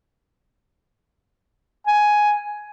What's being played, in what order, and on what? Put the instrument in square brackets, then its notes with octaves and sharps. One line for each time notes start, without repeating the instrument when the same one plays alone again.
[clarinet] G#5